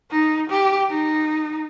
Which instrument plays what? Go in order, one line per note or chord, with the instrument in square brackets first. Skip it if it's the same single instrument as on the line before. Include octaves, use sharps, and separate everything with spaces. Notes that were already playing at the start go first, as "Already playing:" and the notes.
[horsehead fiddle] D#4
G4
D#4